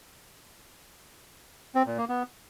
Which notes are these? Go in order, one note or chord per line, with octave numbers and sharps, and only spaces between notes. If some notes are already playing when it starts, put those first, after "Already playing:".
C4
A#2
A#3
B3